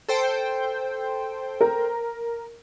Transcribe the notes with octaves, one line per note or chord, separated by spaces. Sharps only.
A4 C5 G5
A#4